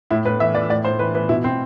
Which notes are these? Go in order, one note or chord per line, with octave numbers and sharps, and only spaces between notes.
A2 E4
A2 B4
E3 E5
E3 D5
A2 D5
A2 C5
E3 B4
E3 B4
B2 E4
B2 C4